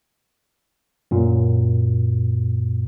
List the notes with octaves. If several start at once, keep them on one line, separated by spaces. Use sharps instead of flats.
F#2 A#2